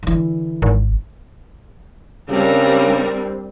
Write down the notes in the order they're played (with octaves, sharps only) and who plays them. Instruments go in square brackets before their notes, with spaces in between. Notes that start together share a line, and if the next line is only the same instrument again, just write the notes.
[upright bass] D3 E3
[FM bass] G#1
[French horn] C#3 [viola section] G3 C4 D4 [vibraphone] G4 C5 [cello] A#4